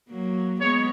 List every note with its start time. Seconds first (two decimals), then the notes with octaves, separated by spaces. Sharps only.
0.09 F#3 A#3
0.60 G#3 B3 C#5